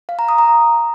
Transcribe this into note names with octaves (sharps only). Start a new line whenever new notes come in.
F5
A#5
D#6
A#5